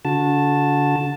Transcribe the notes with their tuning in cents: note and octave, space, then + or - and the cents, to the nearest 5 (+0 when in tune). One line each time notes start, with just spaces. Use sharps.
D3 -40 F#4 -30 A5 +0